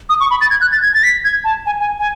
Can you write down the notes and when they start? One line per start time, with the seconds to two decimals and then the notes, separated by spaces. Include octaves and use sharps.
0.10 D#6
0.20 C#6
0.31 B5
0.41 A6
0.50 G#6
0.61 F#6
0.72 A6
0.82 G#6
0.94 A6
1.03 B6
1.25 G#6
1.44 A5
1.66 G#5
1.80 G#5
1.99 G#5